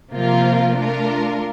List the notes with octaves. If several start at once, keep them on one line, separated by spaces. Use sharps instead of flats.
C3 F3 A#3 F4 A#4
A3 D4 F4 A#4